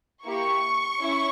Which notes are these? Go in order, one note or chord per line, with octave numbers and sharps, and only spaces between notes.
A#3 E4 G4 C#6
C#4 E4